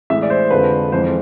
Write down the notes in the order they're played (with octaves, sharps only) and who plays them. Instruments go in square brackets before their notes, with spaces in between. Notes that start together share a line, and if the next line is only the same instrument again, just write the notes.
[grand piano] A2 E3 G#3 E5
D5
C5
F2 D3 F3 G#3 B4
F2 E3 G#3 C5